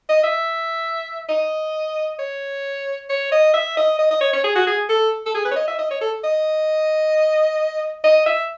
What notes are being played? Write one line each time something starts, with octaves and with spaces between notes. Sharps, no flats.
D#5
E5
D#5
C#5
C#5
D#5
E5
D#5
D#5
D#5
C#5
C#5
G#4
F#4
G#4
A4
A4
G#4
B4
C#5
D#5
E5
D#5
C#5
A4
D#5
D#5
E5